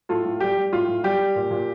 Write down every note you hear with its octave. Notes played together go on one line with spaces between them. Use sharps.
A2 F4 A4
A2
G3 G4
G3
A2 F4
A2
G3 G4
G3
A#2
A#2